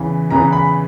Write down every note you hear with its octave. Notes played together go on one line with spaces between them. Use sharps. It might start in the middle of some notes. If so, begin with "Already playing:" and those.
Already playing: E2 C#3 E3
E2 C#3 E3 A#5
B5